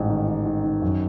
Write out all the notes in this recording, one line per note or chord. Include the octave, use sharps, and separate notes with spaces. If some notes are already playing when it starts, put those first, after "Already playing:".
Already playing: A1 G#2
D#3
D#3
D#3
D#3
F#2